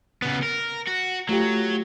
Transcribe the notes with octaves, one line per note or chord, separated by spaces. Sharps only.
C#3 B3
A#4
F#4
F#3 A3 F4 G4